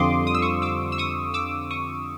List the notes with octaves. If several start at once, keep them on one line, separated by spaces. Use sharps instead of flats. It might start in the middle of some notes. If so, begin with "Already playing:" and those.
Already playing: F2 D3 G3 C4 F4 C6 D6 D#6
D#6
E6
C#6 D#6
D6 E6
E6
C#6 D#6
D6 E6
C#6 D#6